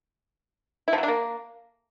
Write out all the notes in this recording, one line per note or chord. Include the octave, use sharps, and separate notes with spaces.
E4
F3
F#3
D4
A#3